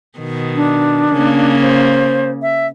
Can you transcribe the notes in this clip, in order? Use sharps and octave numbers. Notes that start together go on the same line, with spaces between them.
B2 D#3
D4
C#3 A#3
C5
E5